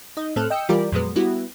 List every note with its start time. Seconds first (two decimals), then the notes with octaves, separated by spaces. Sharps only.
0.17 D#4 D#5
0.36 A2 C4 A4 F6 F#6
0.50 D#5 G5 E6 C#7
0.69 E3 G3 F4 G4 A#4 D5
0.92 F2 A#2 F#3 G#3 B3
1.16 G3 B3 E4 F#4